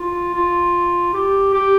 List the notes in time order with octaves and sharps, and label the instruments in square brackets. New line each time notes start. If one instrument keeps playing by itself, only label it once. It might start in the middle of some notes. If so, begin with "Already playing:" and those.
Already playing: [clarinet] F4
F4
G4
G4